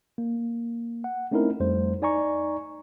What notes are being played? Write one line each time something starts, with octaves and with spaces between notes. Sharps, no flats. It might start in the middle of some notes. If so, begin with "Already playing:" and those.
A#3
F#5
A3 C4 C#4 D#4 E4 A#4
F2 G3 A3 C5
D#4 D5 G#5 A#5 C#6